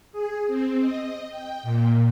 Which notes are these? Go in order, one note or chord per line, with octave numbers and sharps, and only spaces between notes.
G#4
C4
D#5
G5
A#2